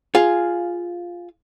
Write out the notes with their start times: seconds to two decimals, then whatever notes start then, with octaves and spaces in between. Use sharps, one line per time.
0.15 F4 G#4 F5